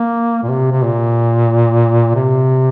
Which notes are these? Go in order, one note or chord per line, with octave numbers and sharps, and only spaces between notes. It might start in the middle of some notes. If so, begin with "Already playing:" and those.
Already playing: A#3
A#2
C3
C3
A#2
C3